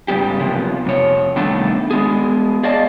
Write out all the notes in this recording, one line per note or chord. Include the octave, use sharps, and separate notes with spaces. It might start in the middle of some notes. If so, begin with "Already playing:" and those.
G#2 C#3 G3 B3 G4
F#2 C3 F3 A#3 B3
F2 C3 C#5
D#3 G3 A3 B3 D4 A4
G#3 B3 G#4
G#4 D5 D#5 F5 A5